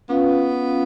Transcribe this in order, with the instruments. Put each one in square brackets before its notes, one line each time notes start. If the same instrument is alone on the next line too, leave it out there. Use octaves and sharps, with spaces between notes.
[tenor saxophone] B3 [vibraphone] C#4 F4 B4 F5